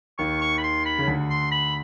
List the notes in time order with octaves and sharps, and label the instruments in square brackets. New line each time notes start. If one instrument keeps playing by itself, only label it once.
[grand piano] D#2 D#3 [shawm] C#6
[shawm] C#6
B5
C6
B5
[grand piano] C#3
D2 D3
[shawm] C6
B5